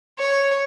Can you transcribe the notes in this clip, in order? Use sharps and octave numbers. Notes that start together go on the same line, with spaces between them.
C#5